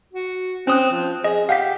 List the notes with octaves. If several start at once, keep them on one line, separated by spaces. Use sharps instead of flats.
F#4
C4 C#4 D#6 F#6
F3
G#4 D#5
G4 F5 F#5 B6